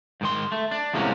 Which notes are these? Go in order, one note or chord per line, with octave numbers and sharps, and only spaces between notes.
G#2 D#3 C6
A3
D4
E2 A2 C3 G#3 A#3 C#4